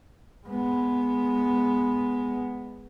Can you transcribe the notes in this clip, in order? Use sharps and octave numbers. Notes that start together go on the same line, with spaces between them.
G#3 B3